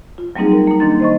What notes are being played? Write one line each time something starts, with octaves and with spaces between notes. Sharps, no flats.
F4
F#3 G3 A#3 C4 D#4 G#4
A#4
A#3 D#4
D#3 D4 C6 A6
C5 D#5 C#6